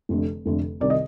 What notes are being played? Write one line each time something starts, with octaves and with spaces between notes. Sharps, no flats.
F1 F2 D3 A3
F1 F2 D3 A3
C2 C3 D#3 D5
D#5